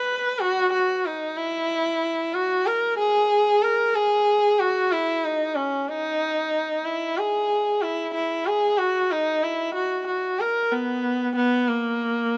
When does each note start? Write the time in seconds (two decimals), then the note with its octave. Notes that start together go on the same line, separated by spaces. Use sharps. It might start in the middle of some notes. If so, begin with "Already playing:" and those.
Already playing: B4
0.41 F#4
0.73 F#4
1.06 D#4
1.37 E4
2.34 F#4
2.67 A#4
2.99 G#4
3.63 A#4
3.95 G#4
4.59 F#4
4.92 E4
5.25 D#4
5.56 C#4
5.89 D#4
6.85 E4
7.17 G#4
7.82 E4
8.14 E4
8.47 G#4
8.78 F#4
9.11 D#4
9.43 E4
9.75 F#4
10.07 F#4
10.40 A#4
10.72 B3
11.36 B3
11.68 A#3